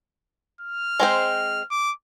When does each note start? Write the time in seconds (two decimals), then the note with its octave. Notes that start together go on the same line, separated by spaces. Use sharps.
0.61 F6
1.00 G#3 C4 C5
1.71 D6